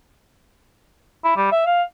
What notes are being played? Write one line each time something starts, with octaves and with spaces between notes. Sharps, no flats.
E4
G3
E5
F5